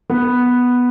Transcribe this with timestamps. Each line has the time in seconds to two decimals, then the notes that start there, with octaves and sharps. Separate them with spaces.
0.10 B3